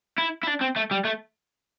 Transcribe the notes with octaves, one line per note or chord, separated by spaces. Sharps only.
E4
E4
D4
C4
A3
G3
A3